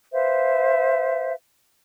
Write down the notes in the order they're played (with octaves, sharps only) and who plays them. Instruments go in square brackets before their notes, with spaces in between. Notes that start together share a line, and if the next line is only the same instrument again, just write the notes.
[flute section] B4 C5 E5 F5